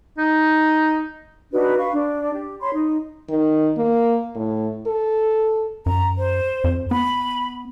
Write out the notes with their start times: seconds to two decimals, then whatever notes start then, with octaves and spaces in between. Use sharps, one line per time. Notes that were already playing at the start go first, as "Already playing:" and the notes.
0.18 D#4
1.52 D4 D#4 F#4 B4
1.78 F5 B5 C#6
1.92 D4
2.33 G4
2.61 C#5 B5 C6
2.73 D#4
3.29 D#3
3.77 A#3
4.35 A2
4.87 A4
5.86 F#2 A#5
6.18 C5
6.64 F2
6.91 B3 B5